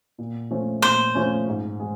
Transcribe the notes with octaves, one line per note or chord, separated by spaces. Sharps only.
A#2
F3 A3 C#4
A#2 C5
F3 A3 C#4
G#2
G#3